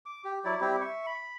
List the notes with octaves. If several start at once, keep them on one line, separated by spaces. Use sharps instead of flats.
D6
G4
F#3 E4 D5
G3 C4 E4 G4
E5 C#6
B5